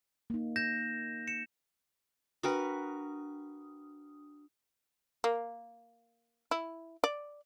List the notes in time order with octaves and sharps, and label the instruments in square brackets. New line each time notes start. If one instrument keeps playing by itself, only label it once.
[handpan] A#3 D#4
[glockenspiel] G6 A#6 E7
C#7 E7
[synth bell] D4 D#6 [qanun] F#4 A#4 B4
[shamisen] A#3
E4
D5